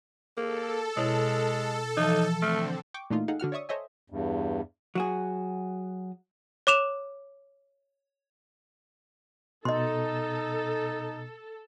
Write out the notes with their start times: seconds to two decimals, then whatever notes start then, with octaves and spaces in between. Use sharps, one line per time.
0.37 A#3 G#4 A4
0.97 B2 G#3 E4 C#5
1.97 E3 F3 D#4
2.42 D3 A3 C4 F6
2.94 G5 C#6 D6
3.10 A#2 E3 A3 A#3 D#4 F4
3.28 D#4 G#4 A4 F5 F#5
3.40 D3 F#4 F#5 F6
3.52 C#5 D5 E5 C#6 D#6
3.69 A4 C5 C#5 D#5 E5 G#5
4.10 E2 G2
4.95 F#3 F#4 G#4
6.67 C#5 D6 E7 F7
9.65 B2 D#4 A4 D#5 C6